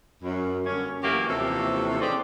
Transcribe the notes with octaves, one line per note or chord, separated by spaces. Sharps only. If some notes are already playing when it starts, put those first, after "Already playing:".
F#2
G2 D3 A#3 C#4
E3 F#3 A3 A#3 F#4 G4
D#2 C3 E3 F3 C#4 A4
D#4 G4 G#4 C5 D5